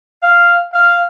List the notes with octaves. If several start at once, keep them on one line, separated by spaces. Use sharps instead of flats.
F5
F5